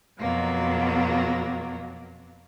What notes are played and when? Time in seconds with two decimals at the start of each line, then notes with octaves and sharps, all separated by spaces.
0.20 F2 B2 F#3 A#3